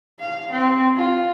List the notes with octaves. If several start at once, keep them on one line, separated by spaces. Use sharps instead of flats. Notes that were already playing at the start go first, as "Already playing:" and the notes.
F5
C4
F4